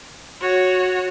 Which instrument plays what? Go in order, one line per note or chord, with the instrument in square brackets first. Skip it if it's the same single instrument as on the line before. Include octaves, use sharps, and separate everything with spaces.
[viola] F#4 C#5